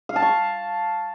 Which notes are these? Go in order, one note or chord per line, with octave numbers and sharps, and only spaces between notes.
F5
A5
C#6